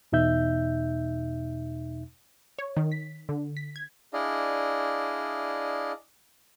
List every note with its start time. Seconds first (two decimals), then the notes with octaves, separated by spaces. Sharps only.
0.12 E2 B2 D#4 E5 G6
2.59 C#5
2.77 D#3
2.92 B6
3.29 D3
3.57 B6
3.76 G#6
4.13 D4 E4 G#4 D5 D#5 F5